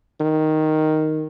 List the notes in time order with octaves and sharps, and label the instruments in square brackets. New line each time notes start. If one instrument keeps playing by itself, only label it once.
[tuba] D#3